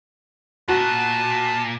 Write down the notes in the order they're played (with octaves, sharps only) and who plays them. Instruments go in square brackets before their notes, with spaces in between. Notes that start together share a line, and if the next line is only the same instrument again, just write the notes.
[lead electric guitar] A#2 [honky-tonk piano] F#4 [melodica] A5